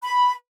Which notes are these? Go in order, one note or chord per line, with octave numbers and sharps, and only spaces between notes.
B5